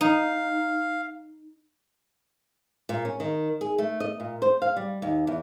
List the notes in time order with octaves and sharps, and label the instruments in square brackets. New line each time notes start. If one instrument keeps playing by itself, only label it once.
[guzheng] D#4 [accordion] F5
[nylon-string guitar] A#2
C#4
D#3
G#4
A3
D#5
A#2
C5
F5
G3
D#2
E2